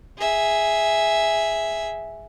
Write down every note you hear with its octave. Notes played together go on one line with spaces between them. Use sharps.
G#4 E5